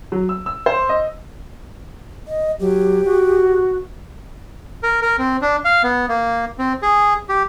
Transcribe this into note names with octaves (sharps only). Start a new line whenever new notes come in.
F#3
E6
E6
C5
D#5
D#5
F#3 G4
F#4
A#4
A#4
C4
D4
F5
B3
A#3
C4
G#4
G4